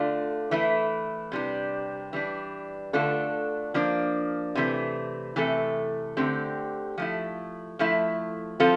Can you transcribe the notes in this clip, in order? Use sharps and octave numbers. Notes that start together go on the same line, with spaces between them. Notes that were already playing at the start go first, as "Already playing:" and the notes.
Already playing: D3 A3 D4 F4
E3 A3 E4
C3 G3 D4
E3 G3 D4
D3 A3 D4 F4 A4
F3 A#3 D4
C3 E3 A3
C3 E3 A3 E4 A4
D3 A3 C4 G4
F3 A3 E4
F3 A3 E4
F3 C4 F4 A4